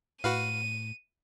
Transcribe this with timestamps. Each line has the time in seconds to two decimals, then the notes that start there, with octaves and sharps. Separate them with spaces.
0.24 A2 F#4 B4 F5 D#7